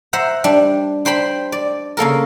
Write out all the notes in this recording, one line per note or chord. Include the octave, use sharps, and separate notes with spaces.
C5 E5 F#5 A#5
G3 D4
D4 C5 G5 B5 C6
D5
C#3 A#3 A4 A#4